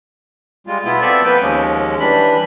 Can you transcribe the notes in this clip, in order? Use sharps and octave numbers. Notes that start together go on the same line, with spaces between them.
G3 G#3 F4
B2 B3 E4 F4
B3 C4 A4 D5 E5
F3 A#3 B3 B4 G5
D#2 F3 G#3 C#4
E3 G3 D4 B5